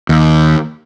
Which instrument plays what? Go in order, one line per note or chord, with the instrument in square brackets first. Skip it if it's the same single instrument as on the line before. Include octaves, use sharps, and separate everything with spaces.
[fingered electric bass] D#2